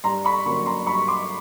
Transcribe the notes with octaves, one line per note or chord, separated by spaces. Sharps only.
G2 A#5 C6
B5 C#6
D3 F#3 A#3 C#4 B5 C#6
A#5 C6
G2 B5 C#6
C6 D6